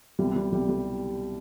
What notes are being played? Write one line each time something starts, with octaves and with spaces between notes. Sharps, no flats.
C2 B2 G3
G3
C2 B2 G3
G3